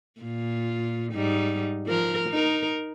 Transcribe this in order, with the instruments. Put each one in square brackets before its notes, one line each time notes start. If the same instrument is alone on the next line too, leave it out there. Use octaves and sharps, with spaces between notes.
[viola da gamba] A#2 F4
G#2 G3 D#4
F3 A#4
D#4 A#4